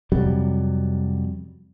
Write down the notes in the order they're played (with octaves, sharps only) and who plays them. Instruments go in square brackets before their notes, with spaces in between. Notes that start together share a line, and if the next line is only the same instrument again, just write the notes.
[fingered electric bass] F2 C3 F#3 G3